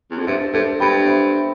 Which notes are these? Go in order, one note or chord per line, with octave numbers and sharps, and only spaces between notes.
E2
F2
G2 C5 E5
G2 A4 C5
G2 G5 B5
C5 E5